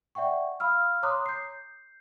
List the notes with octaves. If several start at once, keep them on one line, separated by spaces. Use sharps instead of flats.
D5 E5 F#5 G5 C#6
F5 B5 E6 F6
C#5 A#5 C6 D6 D#6 F#6
G6 C7